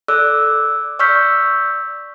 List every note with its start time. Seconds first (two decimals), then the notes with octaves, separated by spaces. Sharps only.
0.08 A4 D5 D6 E6 F#6
0.99 D5 C#6 E6 F6 G6 B6